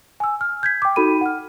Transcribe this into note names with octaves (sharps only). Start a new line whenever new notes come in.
G#5 E6
F6
G6 G#6 B6
G5 D6
D#4 F#4 A4 B5 D#7
F#5 F6